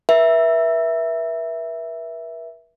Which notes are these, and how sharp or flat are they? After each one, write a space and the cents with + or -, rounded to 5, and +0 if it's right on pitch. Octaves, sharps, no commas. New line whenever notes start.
B4 -45 E5 +0